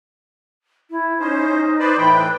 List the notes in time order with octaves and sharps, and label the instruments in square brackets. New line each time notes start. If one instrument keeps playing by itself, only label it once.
[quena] E4
[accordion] C#4 C5 [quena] D#4
[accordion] B4 C5 D5
[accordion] A2 E3 G5 [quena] B5
[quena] B4